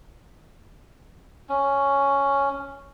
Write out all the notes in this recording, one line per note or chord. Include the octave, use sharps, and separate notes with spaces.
C#4